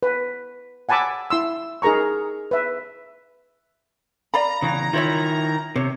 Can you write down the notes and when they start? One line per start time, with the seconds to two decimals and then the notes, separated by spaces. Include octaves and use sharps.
0.03 B4
0.89 F#5 G#5 A5 B5 D6 E6
1.30 E4 C6 E6
1.82 D#4 G#4 A#4 A#5 C#6
2.51 B4 E5
4.34 D5 F5 A#5 B5
4.62 C#3 E3
4.93 D#3 E4 F4 C#5 E5
5.76 C3 C#5